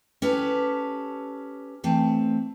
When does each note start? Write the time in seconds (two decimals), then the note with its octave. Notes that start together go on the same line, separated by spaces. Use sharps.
0.22 C#4 G4 A4 B4
1.84 E3 A3 C4